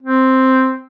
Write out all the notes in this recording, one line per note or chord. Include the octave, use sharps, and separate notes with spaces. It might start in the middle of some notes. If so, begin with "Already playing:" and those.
C4